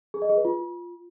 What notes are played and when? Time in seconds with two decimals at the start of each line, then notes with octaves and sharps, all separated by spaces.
0.14 G#4
0.22 D#5
0.29 G#4
0.37 B4
0.45 F4